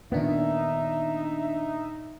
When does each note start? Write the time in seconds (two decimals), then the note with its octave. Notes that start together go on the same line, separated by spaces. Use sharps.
0.12 A#2 D#3 B3 D4 D#4 E5